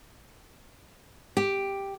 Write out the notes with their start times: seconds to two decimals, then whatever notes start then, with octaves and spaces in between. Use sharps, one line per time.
1.37 G4